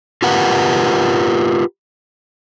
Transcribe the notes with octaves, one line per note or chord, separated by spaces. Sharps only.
F4 G4 A#4 B4 F#5